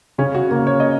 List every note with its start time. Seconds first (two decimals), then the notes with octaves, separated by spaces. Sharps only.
0.18 C#3 C#4
0.34 F#4
0.51 A#3 F#4
0.67 C#5
0.80 D#5